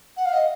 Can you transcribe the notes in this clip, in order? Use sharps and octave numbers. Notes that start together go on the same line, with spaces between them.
F#5
F5
D#5